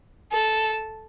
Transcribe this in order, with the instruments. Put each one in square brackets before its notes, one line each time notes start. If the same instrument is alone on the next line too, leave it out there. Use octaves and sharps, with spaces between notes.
[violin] A4